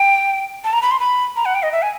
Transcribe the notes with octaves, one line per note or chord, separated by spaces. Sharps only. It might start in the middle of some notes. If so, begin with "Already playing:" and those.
Already playing: G5
A5
A#5
B5
C6
B5
A#5
F#5
G5
D#5
E5
G#5